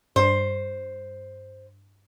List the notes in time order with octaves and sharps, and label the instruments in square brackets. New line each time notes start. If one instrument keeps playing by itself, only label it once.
[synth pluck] G2 [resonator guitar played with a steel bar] C5